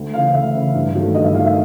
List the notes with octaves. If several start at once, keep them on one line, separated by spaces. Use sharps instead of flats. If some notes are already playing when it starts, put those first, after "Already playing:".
Already playing: D2
C#3 E3 F5
D2 E5
C#3 E3
G2
D#3 F#3 A3
G2 D#5
E5
D#3 F#3 A3 F5
E5